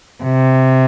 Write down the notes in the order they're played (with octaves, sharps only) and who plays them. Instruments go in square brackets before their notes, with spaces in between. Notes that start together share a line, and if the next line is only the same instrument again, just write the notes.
[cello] C3